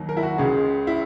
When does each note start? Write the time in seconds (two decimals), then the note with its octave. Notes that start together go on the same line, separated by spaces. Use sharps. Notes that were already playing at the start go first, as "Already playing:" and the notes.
Already playing: D#2 D#3 F#3
0.09 A#4
0.17 E4
0.23 F#4
0.38 C#2 C#3 G#3 G#4
0.87 E4